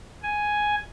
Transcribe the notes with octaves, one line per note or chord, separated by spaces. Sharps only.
G#5